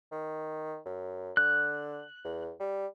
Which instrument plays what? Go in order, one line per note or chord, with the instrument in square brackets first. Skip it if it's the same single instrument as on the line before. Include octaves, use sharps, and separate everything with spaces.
[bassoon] D#3
F#2
[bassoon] D3 [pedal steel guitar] F#6
[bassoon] E2
G3